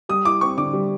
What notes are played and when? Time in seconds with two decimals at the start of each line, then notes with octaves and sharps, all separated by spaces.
0.09 G3 D#6
0.25 E4 D6
0.41 C4 C#6
0.58 D3 D6
0.73 G3